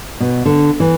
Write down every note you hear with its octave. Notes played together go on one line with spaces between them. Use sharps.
B2
D3
E3